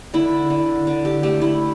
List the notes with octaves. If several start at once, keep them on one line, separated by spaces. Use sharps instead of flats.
D3 E4
D3
D3
G4
A3 G4
E4